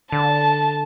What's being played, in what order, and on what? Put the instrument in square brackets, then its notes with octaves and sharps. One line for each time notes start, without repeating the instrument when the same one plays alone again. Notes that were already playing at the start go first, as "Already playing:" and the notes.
[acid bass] D3 [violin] A5